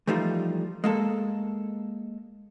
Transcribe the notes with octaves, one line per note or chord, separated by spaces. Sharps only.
E3 F3 G3 A3 D#4 F4
G#3 A#3 A4